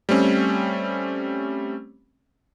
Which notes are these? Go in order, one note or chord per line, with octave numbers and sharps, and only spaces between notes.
G3 A3 C4 C#4